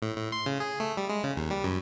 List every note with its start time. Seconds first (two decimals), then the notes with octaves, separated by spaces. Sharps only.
0.02 A2
0.16 A2
0.32 C6
0.46 C#3
0.60 G#4
0.80 A3
0.97 G3
1.09 G#3
1.24 C#3
1.36 D#2
1.51 G3
1.64 F#2